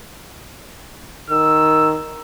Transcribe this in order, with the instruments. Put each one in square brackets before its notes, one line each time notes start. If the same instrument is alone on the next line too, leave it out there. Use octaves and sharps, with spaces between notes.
[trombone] D#3 [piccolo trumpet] E6